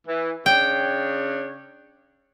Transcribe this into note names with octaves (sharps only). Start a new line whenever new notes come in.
E3
C#3 D4 C#5 G5